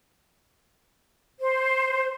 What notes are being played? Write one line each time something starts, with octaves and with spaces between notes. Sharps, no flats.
C5